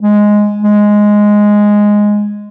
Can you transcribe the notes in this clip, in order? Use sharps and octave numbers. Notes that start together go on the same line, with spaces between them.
G#3
G#3